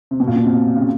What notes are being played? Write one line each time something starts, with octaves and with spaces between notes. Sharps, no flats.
C3
B2
A#2
B2
C3
C#3